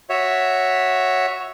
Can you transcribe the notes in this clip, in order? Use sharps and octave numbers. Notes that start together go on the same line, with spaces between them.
F#4 C#5 E5